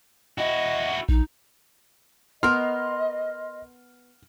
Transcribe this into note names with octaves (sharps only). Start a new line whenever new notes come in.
E4 F#4 D#5
A#1 D#4
B3 A#4 D#5 C6 F6